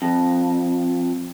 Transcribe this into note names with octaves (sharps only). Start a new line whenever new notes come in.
F2